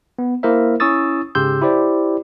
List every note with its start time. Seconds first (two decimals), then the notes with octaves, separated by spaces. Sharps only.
0.19 B3
0.43 A#3 E4 A#4 C5 E5
0.80 C#4 E4 C#6 D#6 E6 A6
1.35 G#2 C#3 G4 C6 E6 G6
1.61 E4 G4 C5 D5